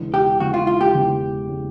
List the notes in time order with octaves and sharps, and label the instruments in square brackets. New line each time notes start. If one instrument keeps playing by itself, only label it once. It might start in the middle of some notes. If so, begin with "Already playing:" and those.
Already playing: [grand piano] E1 E2 C#3 E3 G#3
[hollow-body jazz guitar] G4
[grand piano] E1 E2 C#3 E3 G#3 [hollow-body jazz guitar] F#4
[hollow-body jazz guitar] F4
F4
G4
[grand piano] E1 E2 C#3 E3 G#3
C#3 E3 G#3